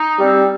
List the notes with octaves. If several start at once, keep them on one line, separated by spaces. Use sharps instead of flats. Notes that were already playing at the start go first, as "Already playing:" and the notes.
Already playing: D#4
G3 C4